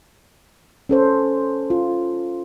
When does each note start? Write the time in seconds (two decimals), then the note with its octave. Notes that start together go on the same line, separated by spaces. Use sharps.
0.89 C#4 A4 C5
1.70 F4